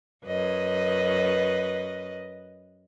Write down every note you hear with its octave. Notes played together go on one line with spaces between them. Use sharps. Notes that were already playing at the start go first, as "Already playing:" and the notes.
F#2 B4 D#5